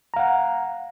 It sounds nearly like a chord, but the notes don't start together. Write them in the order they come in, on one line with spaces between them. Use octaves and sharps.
A#5 F5 F#5